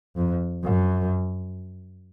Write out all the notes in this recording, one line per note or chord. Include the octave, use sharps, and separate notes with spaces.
F2
F#2